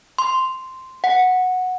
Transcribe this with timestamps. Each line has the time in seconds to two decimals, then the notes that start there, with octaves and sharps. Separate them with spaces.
0.18 C6
1.04 F#5